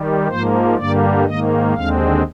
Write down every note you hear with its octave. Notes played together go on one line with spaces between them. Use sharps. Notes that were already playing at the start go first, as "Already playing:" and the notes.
Already playing: D#3 G3
G#2 F3 A#3 C5
G2 D3 G3 A#3 D5
G#2 D#3 A#3 D#5
D#2 D3 G#3 C4 F5